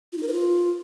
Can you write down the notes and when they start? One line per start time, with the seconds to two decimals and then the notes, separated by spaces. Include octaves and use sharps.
0.13 F4
0.18 D#4
0.23 A#4
0.28 B4
0.33 F4